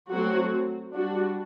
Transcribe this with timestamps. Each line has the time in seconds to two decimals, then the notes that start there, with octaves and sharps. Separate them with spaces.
0.11 F#3 A3 C4 F#4
0.94 G3 D4 F#4